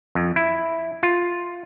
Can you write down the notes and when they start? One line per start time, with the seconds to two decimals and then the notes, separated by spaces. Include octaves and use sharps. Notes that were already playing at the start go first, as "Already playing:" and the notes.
0.15 F2
0.36 E4
1.03 F4